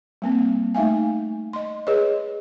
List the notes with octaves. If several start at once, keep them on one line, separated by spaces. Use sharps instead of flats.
G3 A#3 C4
A3 D#4 E5 F5 G#5
D#5 C6
G#4 B4 C#5 D#5